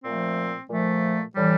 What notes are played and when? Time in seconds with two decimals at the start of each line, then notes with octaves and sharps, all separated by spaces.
0.03 A#2 F3 A3 C4
0.69 A#2 F3 A3
1.35 A2 E3 G3